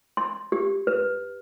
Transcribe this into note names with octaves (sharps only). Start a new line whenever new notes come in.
C6
G4
B4